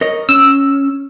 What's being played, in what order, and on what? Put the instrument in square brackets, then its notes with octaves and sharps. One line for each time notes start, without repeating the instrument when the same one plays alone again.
[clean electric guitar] A#4 C#5 D#5
[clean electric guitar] C#4 [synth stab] E6